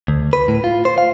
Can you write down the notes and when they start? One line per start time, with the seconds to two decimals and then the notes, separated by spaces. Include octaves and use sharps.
0.08 D2
0.33 B4
0.48 A2
0.64 F4
0.85 C5
0.98 F5